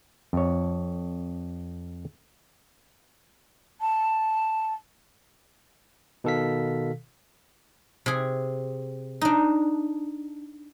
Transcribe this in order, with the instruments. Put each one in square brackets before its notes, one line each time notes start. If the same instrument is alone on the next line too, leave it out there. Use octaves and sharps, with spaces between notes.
[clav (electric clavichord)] F2 C#5
[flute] A5
[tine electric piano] B2 D#3 A4 F5 B6
[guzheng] C3 G#4
D4 D#4